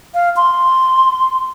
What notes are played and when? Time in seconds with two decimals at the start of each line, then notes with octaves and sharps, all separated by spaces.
0.14 F5
0.36 C6